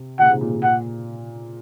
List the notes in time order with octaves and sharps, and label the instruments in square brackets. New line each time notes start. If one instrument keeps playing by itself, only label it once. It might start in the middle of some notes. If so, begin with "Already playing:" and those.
Already playing: [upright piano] C3
[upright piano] A#2 C#3 [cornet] F#5
[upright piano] G#2 C3
A#2 C#3
G#2 C3
[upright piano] A#2 [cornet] F#5